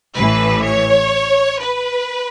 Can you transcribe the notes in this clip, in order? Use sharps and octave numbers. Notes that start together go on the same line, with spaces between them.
A1 A2 E3 B4
C#5
B4